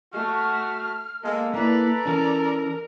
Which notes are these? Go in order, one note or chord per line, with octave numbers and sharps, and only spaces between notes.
A3 F#4 F6
G#3 A#3 A4
A#3 E4 A4 B4 D5 A#5
E3 C#4 A#4